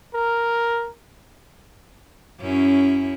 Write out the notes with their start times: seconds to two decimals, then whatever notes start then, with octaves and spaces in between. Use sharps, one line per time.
0.14 A#4
2.41 F#2 C#4 E4